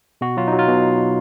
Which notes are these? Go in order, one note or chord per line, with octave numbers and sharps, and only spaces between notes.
B2 F#4
F#3 F4
D#4
F#3
F4
B2